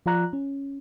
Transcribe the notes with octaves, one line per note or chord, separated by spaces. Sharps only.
F3 F4 D5 A#5 F#6
C#4